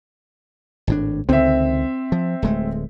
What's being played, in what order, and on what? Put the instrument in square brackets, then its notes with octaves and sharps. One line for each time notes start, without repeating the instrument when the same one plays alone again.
[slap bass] G#1 A2 D4
[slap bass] C#2 D3 D#3 [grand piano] C4 E5
[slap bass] F3
D1 G#3 A3